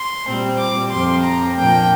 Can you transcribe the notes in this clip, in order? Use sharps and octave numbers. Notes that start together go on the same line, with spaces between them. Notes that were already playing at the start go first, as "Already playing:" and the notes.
Already playing: C6
A#2 G3 C4
D6
F2 F3 C4 C6
A#5
A#2 F3 A#3 D4 G5